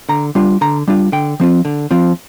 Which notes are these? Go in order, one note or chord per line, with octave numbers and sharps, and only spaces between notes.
D3 A#5
G3 D4 F4
D3 A#5
G3 D4 F4
D3 G5
F3 C4 F4
D3
F3 C4 F4